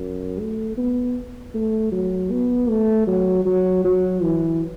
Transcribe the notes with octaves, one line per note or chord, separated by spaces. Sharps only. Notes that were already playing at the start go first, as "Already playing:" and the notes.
Already playing: F#2
A3
B3
A3
F#3
B3
A3
F#3
F#3
F#3
E3